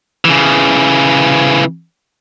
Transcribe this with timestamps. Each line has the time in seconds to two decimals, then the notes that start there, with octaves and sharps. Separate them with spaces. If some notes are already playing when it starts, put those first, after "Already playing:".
0.25 C#3 E3